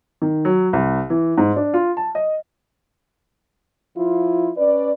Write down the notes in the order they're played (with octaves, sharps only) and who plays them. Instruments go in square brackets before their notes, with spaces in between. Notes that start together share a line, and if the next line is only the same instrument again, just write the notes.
[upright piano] D#3
F#3
C2
E3
G#2
D4
F4
A5
D#5
[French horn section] F3 E4 F4
C#4 B4 D5